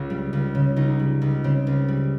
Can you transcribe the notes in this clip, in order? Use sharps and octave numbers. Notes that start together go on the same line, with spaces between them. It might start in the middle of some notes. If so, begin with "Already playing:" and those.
Already playing: C#2 F4
G3
C#2
C#3
C#2 D#4
G3
C#2
C#3 C4
C#2
G3